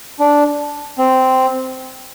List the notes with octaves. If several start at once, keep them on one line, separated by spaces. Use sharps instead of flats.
D4
C4